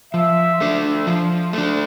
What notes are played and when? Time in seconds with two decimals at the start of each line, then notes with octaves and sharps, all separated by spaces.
0.14 F3 E5
0.60 A3 D4
1.07 F3
1.53 A3 D4